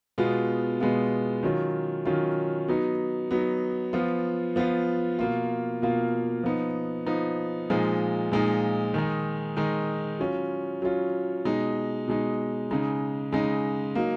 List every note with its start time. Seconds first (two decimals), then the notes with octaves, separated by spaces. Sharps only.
0.18 B2 G#3 B3 F4
0.80 B2 G#3 B3 F4
1.43 D#3 F#3 C#4 F4
2.05 D#3 F#3 C#4 F4
2.68 F#3 B3 D#4
3.31 F#3 B3 D#4
3.93 F3 B3 F4
4.56 F3 B3 F4
5.19 B2 A#3 F4
5.82 B2 A#3 F4
6.43 F3 B3 D#4
7.06 F3 B3 D#4
7.70 A#2 F3 G#3 D#4
8.32 A#2 F3 G#3 D#4
8.94 D#3 G#3 D#4
9.57 D#3 G#3 D#4
10.19 F#3 C#4 F4
10.82 F#3 C#4 F4
11.45 B2 G#3 D#4
12.08 B2 G#3 D#4
12.71 C#3 G#3 D#4
13.32 C#3 G#3 D#4
13.95 F#3 A#3 D#4